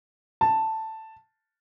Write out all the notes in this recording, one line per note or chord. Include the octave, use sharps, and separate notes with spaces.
A5